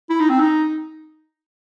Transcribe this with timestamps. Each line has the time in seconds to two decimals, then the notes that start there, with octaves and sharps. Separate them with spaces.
0.09 E4
0.20 D#4
0.30 C4
0.40 D#4